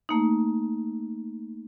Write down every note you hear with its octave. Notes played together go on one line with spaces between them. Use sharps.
A3 A#3 D#4